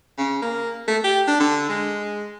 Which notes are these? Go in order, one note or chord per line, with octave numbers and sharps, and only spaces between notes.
C#3
A#3
A3
G4
D4
D3
G#3